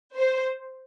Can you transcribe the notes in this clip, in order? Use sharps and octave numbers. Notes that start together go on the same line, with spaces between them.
C5